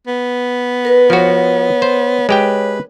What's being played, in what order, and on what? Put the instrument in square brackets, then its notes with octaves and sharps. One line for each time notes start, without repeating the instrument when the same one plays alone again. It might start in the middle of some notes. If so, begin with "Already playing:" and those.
[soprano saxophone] B3
[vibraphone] A#4 B4
[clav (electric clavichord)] F3 F#4 [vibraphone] A#4 C#5
[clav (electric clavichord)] C5
[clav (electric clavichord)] G#3 G4 G5 [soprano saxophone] B4